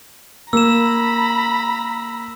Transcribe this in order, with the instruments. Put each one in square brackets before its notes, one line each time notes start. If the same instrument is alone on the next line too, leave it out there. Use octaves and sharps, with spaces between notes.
[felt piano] A#3 [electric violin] A#5 B5 [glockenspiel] E6 E7